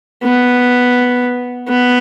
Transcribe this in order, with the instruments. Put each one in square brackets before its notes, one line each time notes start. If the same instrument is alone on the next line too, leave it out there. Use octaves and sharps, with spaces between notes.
[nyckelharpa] B3
B3